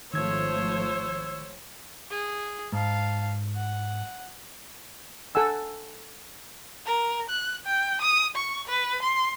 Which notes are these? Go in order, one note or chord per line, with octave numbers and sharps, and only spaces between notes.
G#1 D#3 F3 A3 C5 C#5 E6 G#6
G#4
G#2 F5 A5
F#5
A4 F#5 G#5 E6
A#4
F#6
G5
D#6
C#6
B4
C6